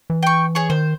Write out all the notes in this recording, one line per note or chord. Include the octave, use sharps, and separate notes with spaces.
E3
G5 C#6
G#4 C#5 C#6
D#3 C5